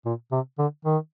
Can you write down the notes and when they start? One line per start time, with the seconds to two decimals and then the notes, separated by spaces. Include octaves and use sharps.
0.06 A#2
0.32 C3
0.59 D3
0.85 D#3